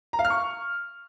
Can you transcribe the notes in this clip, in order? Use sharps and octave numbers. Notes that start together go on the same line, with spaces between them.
A#5
F5
F6
C#6